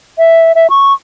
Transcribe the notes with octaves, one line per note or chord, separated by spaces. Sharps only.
E5
E5
C#6